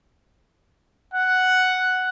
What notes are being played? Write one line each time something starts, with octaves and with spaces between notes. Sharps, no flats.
F#5